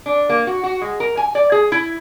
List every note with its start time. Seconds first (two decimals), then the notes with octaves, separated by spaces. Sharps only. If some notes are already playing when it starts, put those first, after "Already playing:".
0.06 D4
0.29 A#3
0.47 F#4
0.64 F#4
0.81 G#3
1.00 A#4
1.17 G#5
1.35 D5
1.52 G#4
1.72 E4